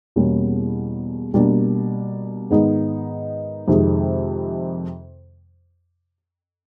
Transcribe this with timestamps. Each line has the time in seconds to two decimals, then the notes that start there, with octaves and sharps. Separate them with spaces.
0.16 E2 B2 G3 A#3 C#4
1.34 B2 G3 A#3 D4
2.50 G#2 D#3 G#3 B3 D#4
3.68 F2 C3 D#3 G#3